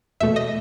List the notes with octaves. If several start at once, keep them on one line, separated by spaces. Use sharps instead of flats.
E2 B2 A3 E5
D#5